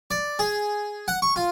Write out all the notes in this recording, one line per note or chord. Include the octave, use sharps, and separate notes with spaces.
D5
G#4
F#5
C#6
F4